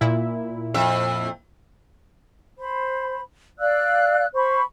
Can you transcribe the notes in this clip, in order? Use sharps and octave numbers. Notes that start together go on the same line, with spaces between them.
A#2 E4
F2 E5
C5 B5
D5 F5 E6 F#6
C5 B5 C#6